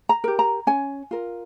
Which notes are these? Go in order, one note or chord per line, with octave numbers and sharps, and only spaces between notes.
A#5
G4 A#4
A#5
C#4 G#5
F4 A#4